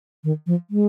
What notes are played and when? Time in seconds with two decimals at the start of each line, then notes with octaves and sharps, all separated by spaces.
0.24 D#3
0.47 F3
0.71 G#3